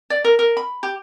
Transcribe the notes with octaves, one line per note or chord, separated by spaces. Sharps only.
D5
A#4
A#4
B5
G4